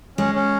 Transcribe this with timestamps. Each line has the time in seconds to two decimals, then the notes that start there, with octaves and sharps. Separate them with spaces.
0.18 G#3 C#4
0.35 C#4